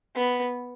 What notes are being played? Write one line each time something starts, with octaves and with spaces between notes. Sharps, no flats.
B3